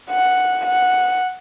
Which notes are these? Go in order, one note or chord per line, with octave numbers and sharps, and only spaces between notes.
F#5
F#5